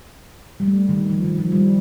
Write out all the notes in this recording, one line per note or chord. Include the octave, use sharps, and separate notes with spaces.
G3
A3
D#3
F3
D#3
F3
G3